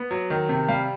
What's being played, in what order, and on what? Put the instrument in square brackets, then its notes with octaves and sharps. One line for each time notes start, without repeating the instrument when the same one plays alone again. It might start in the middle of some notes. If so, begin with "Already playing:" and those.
Already playing: [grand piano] B3
F#3
D#3
C3
G3 F5